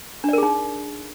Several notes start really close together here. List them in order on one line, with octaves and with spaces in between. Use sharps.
D4 D5 A#4 G#4 D#4